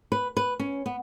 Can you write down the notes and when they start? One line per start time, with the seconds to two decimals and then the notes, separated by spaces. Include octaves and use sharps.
0.12 B4
0.37 B4
0.60 C#4
0.86 B3